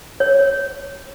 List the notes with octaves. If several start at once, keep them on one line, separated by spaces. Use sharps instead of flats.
C#5